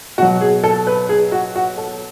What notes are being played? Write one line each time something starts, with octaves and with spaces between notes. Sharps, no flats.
B2 F#3 F#4
G#4
A4
B4
G#4
F#4
F#4
A4